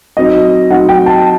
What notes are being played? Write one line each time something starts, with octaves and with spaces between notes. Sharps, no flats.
F#3 C4 D#4 D#5
F#3 C4 D#4 F#5
G5
A5